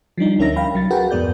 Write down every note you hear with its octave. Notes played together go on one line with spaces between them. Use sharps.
F3 G3 D4 D#4
D2 C#4 A#4 E5 A#6
F5 G5 B5
C2 F#3 A6
F#4 G#4 A#4 B4 F#5 G5
F2 G#2 B3 D5 G6